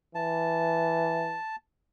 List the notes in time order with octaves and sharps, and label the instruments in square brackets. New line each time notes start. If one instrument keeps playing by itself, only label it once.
[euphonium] E3 [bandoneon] A5